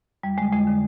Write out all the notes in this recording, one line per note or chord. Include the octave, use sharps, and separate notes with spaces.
F2 G3
D3 G#3
F2 G#3
D3